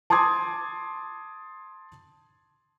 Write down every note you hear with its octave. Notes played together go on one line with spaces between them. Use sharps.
A5 C6 D6 D#6 G#6